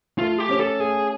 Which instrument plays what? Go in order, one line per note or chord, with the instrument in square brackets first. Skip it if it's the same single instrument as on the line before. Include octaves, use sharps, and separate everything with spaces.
[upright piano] A3 [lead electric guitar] F4
[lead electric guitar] G4
[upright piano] C#4
[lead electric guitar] A4
[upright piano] A3 [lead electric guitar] G#4